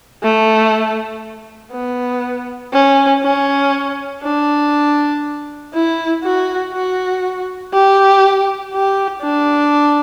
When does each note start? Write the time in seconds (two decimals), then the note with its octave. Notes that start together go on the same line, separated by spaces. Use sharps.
0.23 A3
1.72 B3
2.73 C#4
3.23 C#4
4.23 D4
5.73 E4
6.23 F#4
6.72 F#4
7.73 G4
8.73 G4
9.23 D4